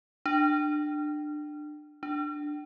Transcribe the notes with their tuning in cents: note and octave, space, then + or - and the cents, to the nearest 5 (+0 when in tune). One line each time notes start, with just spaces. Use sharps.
D4 +25
D4 +10